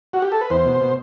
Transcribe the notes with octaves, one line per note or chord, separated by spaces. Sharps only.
F#4
G4
A4
B4
E2 C5
B2
B2